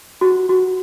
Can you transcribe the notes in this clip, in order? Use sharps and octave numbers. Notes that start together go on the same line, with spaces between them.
F#4
F#4